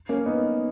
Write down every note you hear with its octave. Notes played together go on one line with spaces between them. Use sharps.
A#3 C#4
B3 D#4